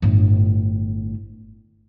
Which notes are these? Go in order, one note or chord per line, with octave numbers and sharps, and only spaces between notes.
G1 A2